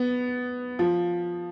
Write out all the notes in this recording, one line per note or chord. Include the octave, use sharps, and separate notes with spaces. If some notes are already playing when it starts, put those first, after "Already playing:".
Already playing: B3
F3